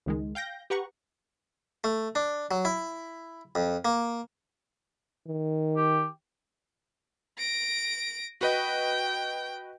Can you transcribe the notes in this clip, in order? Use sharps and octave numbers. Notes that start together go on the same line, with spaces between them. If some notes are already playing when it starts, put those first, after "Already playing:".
C#2 D#3 G#3
F5 G5 G6 A#6
G4 B4 F#5 A#5 C#6
A3
D4
F#3
E4
F2
A#3
D#3
G4
A#6 D7
F#4 B4 D#5 G5